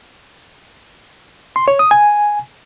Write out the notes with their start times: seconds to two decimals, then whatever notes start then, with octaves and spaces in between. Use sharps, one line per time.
1.56 C6
1.68 C#5
1.79 D#6
1.91 G#5